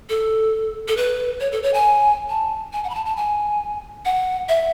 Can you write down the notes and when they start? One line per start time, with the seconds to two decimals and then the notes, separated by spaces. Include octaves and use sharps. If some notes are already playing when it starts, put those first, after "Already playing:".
0.09 A4
0.88 A4
0.97 B4
1.40 C#5
1.52 A4
1.63 C#5
1.74 G#5
2.29 A5
2.73 G#5
2.84 F#5
2.90 B5
2.95 A5
3.05 A5
3.17 G#5
4.05 F#5
4.49 E5